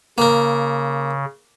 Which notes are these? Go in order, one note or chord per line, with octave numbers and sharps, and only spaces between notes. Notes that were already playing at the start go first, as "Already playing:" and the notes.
C#3 A#3 A#4